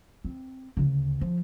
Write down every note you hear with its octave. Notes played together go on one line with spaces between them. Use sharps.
C4
D2 C#3
F3